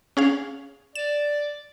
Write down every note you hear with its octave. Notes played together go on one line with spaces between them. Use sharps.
C#4 G#4 F5
D5 E7